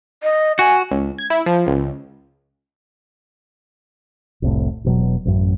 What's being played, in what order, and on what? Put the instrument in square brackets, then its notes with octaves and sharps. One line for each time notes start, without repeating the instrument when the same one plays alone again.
[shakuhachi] D#5
[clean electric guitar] F#4 [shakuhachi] G#5
[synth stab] C#2
G#6
E4
F3
C#2
[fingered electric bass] F1 C2 A2
E1 B2 F#3
A1 F#2